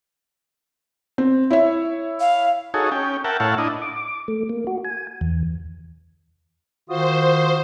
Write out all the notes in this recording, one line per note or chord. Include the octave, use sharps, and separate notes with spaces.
C4
E4 C#5 E5
F5
D#4 F#4 G#4 A4 C#5
C#4 G5
A#4 E5 F#5 G5 A5
A2 E4 C#5 F5 F#5 A5
D4 E4 D#5
D6
A3
A#3
F#4
G#5
E2
D#3 F4 F#4 C5 D#6